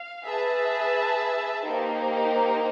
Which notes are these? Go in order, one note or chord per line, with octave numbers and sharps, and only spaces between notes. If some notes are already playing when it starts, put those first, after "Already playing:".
Already playing: F5
G#4 B4 E5 A5
A#3 D#4 G4 C5